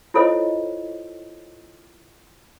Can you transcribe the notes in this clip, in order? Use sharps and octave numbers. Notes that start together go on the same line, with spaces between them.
E4 F4 A4 C5 C#5 D#5